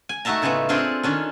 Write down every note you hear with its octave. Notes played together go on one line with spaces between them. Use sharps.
G#5
A3 D#4 F#4 E5 A5 A#5
A2 C#3 G#3 A3 B3
C4 D4 F4 G#4 A4 D5
D#3 C#4 D4